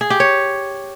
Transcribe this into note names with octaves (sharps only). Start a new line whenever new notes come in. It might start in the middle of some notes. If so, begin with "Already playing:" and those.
G#4
G4
C#5